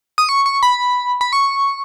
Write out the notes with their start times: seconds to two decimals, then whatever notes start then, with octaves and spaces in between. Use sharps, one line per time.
0.18 D#6
0.29 C#6
0.46 C#6
0.63 B5
1.21 B5
1.33 C#6